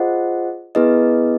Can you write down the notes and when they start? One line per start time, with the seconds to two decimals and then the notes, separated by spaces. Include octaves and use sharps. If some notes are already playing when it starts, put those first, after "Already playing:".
Already playing: F4 G#4 C5 D#5 F#5
0.75 B3 E4 G#4 B4 D#5